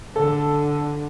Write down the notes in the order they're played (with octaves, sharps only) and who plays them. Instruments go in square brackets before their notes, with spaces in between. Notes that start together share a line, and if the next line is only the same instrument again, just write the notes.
[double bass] D3 [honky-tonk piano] A4